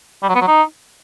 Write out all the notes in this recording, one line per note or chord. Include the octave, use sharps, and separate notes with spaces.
G3
F#3
B3
F#3
D#4